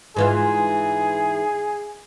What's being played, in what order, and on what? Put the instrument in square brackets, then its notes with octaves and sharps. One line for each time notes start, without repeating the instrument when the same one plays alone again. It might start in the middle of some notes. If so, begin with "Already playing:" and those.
[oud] G#2 E3 F4 [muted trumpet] G#4